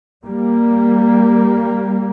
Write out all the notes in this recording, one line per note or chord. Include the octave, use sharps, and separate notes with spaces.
G3 A#3